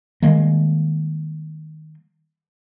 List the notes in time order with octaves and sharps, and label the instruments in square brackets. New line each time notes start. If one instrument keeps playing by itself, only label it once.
[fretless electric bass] D#3 G3 G#3 A#3